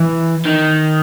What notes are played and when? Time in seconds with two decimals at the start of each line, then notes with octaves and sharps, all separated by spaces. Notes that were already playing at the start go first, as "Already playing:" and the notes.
Already playing: E3
0.45 D#3